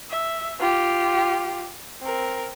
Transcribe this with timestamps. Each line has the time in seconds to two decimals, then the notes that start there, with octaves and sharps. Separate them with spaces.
0.10 E5
0.59 F4 G4
2.01 C4 A#4